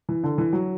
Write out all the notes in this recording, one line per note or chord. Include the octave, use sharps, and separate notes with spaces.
E3
D3
E3
F#3